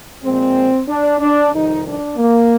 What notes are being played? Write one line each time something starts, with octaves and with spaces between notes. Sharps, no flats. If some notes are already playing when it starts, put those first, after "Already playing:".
A#2 F3 G#3 C4
D4
D4
F2 C3 D#3 G3 D#4
D4
A#3